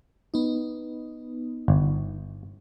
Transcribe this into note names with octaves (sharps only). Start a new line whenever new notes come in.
B3 D#4
G1